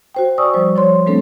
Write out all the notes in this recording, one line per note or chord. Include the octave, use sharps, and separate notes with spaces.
F#4 C5 G5
D5 G#5 C#6 D#6 E6
F3 G3 C5
F3 C#5 C6
G3 A3 C4 D4 A4